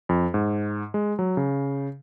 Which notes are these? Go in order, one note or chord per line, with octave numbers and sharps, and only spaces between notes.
F2
G#2
G#3
F#3
C#3